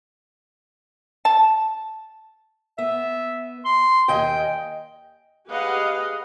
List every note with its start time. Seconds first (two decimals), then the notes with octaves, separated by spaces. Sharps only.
1.25 A5
2.78 B3 E5
3.65 C6
4.08 D#2 D#5 G5 G#5
5.48 G4 G#4 B4 D#5 F5 F#5